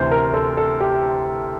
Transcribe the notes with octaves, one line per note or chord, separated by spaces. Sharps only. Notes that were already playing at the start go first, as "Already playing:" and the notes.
Already playing: D2 C3 E3 C5
A#4
A4
A4
G4